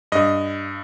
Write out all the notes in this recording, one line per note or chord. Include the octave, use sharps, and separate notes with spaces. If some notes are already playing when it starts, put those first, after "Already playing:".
G2 D#5